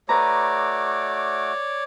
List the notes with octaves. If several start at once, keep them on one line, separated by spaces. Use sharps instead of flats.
A3 F#4 B4 C#5 D5 A#5 D6